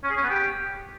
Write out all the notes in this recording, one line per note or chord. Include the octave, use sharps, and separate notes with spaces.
C#4
G#4
C#4
B3
G4